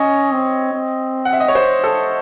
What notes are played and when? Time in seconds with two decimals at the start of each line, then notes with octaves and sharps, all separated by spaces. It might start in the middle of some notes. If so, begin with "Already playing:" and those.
Already playing: C#4 C#5 D#5
0.31 C4
0.72 C4
1.25 F#5
1.33 E5
1.40 D#5
1.48 C#5
1.55 C5
1.84 A4